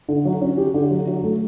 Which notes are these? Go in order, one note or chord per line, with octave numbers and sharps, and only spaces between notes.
D3
F#3
C#4
G4
D3
F#3
F#3
A3